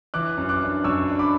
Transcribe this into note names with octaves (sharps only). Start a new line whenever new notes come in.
E3 D6 F#6
F#2
D6 F#6
D4
F#2 C#6 E6
D4
B5 D6